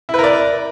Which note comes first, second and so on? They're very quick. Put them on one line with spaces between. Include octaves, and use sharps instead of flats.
E4 B4 A#4 D5